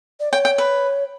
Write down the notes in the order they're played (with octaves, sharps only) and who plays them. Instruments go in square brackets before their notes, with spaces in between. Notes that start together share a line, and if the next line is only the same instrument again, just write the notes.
[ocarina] D5
[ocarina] C#5 [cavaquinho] G5
[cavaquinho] G5
B4